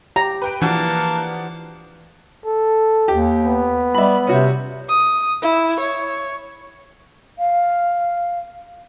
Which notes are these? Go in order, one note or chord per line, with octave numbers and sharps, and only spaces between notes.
G4 A#5
B4 G5 D7
E3 F3 A#3 D4 F#4 A5
A4
D#2 G4
B3
G3 E5 B5
C3 C#4 F#4
D#6
E4
C#5
F5